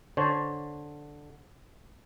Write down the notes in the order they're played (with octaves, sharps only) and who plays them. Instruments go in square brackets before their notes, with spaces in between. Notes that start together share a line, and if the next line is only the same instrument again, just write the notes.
[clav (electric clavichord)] D3 [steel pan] C5 C#5 A5